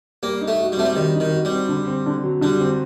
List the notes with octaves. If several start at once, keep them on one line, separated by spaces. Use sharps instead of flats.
G3 A#3
D#4
A3
F#4
G3
A3 C4
G3
D#3 G3
D#4
D#3
F#4
G3
C4
D3
C4
D3
F#3
D3 G3
C4